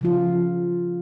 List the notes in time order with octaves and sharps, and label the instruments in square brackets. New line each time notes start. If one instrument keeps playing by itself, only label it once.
[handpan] C#3 F3 F4